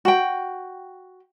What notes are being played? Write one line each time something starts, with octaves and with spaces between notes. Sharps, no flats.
F#4 G5